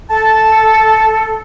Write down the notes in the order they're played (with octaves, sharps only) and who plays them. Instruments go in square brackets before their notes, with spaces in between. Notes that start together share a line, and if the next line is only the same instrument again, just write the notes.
[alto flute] A4 [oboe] A5